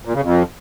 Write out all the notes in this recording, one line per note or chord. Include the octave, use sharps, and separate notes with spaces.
A#2
C#3
F2